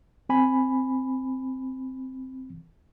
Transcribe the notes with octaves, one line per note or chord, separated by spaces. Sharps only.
C4 G#5 B5